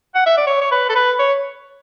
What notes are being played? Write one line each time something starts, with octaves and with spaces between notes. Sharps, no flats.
F#5
E5
D5
C#5
C#5
B4
A4
B4
C#5